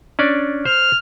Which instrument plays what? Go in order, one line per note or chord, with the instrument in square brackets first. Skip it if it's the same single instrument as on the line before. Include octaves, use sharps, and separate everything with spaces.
[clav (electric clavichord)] C#4 D4 D5
[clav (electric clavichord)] C5 [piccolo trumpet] F6